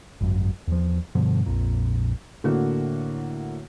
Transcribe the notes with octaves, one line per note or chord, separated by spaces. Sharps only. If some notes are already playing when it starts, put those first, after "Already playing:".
G#1 F#2
E2 F3
G2 B2 D3 F3
A#1 F2 A#2
A2 D3 A#3 F#4